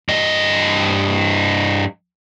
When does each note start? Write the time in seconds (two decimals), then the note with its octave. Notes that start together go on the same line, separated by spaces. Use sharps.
0.09 G2 D#5